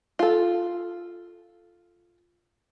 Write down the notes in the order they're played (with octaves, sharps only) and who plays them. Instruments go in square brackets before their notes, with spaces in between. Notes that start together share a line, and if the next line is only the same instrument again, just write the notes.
[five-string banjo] F4 A4